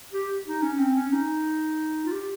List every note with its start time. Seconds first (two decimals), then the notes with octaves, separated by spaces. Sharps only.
0.13 G4
0.47 D#4
0.62 C#4
0.79 C4
0.95 C#4
1.13 D#4
2.06 F4
2.12 G4